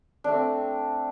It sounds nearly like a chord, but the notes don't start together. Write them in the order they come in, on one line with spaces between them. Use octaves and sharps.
D4 A3 C4